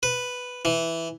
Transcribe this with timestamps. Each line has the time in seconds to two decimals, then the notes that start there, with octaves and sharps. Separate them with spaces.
0.03 B4
0.65 E3